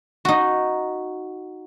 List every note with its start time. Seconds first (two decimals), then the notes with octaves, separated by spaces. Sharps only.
0.25 D#4 F#4